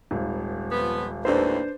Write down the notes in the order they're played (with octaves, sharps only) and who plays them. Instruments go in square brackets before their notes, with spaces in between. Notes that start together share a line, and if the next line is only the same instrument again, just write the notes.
[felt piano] D#1 G#1
[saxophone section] F3 B3
[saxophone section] D#2 A2 [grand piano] D4 B4 C5